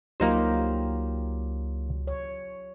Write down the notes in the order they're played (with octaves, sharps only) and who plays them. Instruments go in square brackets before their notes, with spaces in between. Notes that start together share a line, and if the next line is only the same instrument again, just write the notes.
[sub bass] C#2 [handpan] F#3 F4 G4 [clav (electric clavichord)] A#3 D#4 C5
[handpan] C#5